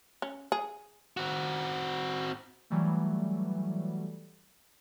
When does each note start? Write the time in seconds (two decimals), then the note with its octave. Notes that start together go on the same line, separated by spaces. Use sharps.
0.22 C#4
0.52 G#4
1.17 C4 F#4
2.70 E3 F#3 G3 A3